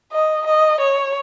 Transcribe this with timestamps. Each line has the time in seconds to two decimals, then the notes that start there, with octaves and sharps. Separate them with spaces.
0.13 D#5
0.46 D#5
0.80 C#5